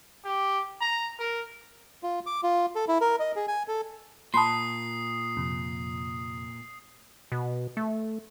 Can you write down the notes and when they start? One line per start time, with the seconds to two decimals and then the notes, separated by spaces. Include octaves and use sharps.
0.25 G4
0.81 A#5
1.19 A#4
2.03 F4
2.26 D6
2.43 F4
2.75 A4
2.88 E4
3.01 A#4
3.20 D#5
3.36 G#4
3.48 G#5
3.68 A4
4.34 A#2 A5 B5 C6 D#6 C7
5.37 F2 C3
7.32 B2
7.77 A3